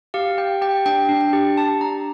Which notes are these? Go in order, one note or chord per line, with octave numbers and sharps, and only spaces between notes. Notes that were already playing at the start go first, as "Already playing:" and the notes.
G4 F5
G4 G5
G4 G5
D4 G5
D4
G5
G4
G4 A5
D4 A#5